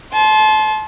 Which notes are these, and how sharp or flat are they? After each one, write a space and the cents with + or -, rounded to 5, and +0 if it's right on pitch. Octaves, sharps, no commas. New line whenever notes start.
A5 -30 C6 +10